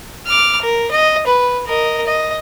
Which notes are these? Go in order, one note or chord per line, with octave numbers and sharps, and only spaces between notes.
D6 F6
A#4
D#5
B4
A#4 D#5
D#5